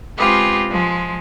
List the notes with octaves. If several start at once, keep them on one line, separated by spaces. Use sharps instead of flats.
G#3 B3 C4 F4 G4 G#4
F3 G#3